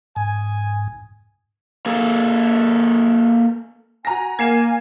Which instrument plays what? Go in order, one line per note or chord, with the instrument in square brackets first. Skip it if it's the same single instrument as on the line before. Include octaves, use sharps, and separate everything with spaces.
[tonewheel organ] G#2 [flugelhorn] G#5
[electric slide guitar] A#3 G#4 A4
[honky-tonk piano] F#4 A#5 A#6 [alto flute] G#5
[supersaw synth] A#3 [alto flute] G#5 [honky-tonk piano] G#6 C7 E7